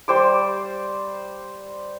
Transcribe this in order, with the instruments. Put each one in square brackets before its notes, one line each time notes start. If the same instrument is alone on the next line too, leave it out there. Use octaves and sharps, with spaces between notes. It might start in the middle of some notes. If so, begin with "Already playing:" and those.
[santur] G3 C5 D6